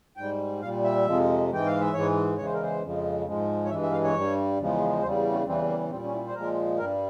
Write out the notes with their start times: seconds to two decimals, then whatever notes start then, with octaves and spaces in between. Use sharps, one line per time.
0.17 G#2 G3 G5
0.62 A#2 G3 F5
0.84 E5
1.06 F2 C3 F3 G#3
1.50 G#2 E3 G#3 G5
1.66 F5
1.81 E5
1.93 G#2 E3 G#3 C#5
2.38 E2 C#3 E3 G#3 C#5
2.46 C5
2.54 A#4
2.63 C5
2.82 F2 C#3 F3 G#3
3.27 G#2 F3 G#3
3.65 C#5
3.70 G2 E3 G#3 E5
3.82 E5
3.92 F5
4.04 C#5
4.14 G2 G3
4.59 E2 C#3 F3 G#3
5.03 E2 C#3 G3 C5
5.32 C#4
5.46 E2 C#3 E3 G3 C4
5.69 A#3
5.90 A#2 G3 C4
6.04 C#4
6.13 E4
6.27 C5
6.35 A#2 F3 G#3 A#4
6.79 G2 G3 A#4